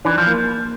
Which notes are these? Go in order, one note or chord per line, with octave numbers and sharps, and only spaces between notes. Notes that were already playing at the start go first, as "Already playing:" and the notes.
E3 D4
F3
A#3